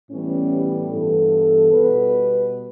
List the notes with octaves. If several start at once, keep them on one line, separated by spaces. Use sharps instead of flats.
A2 E3 G3 B3 C#4
G4
G2 E3 B3 A4
B2 G3 B3 B4